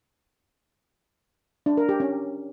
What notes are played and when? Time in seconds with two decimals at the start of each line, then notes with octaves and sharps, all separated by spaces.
1.66 D4
1.77 A#4
1.89 G4
2.00 C#4